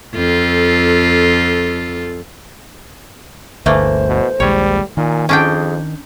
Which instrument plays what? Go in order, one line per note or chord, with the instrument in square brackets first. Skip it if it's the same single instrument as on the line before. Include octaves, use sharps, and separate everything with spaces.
[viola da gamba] F2 F4 A4
[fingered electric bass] G1 D2 [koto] E3 A3 A#3 [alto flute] C5
[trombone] B2
[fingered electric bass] A#1 D#2 G#3 [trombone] G3 [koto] C#5
[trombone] A#2 [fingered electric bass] D#3 [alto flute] G#5
[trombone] F2 [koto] C#4 D4 G5 [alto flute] G#4